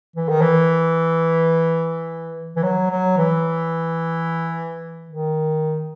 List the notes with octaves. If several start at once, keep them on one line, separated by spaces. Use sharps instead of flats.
E3
D#3
E3
E3
F#3
F#3
E3
D#3